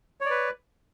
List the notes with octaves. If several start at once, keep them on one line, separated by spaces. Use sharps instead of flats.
B4 C#5 D5